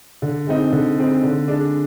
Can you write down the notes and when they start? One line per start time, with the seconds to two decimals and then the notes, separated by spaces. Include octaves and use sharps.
0.22 D3
0.47 G#3 C4 D#4
0.72 D3
0.98 G#3 C4 D#4
1.24 D3
1.48 G#3 D4